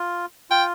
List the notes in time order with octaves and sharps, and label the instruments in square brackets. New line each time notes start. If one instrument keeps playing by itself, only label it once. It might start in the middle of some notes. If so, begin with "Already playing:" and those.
Already playing: [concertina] F4
[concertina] F4 [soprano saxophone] G5